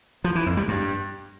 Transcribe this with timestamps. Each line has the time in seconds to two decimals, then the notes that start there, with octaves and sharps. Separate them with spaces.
0.24 F3
0.35 E3
0.46 F2
0.57 G3
0.68 G2